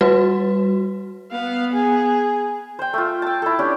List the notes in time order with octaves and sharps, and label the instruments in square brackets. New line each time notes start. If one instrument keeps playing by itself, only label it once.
[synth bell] G3 F#4 B4
[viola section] B3 [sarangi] F5
[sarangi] G#4
[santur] C5 G5
A3 F4
G5 A5
E4 A4
C#4 D4 G4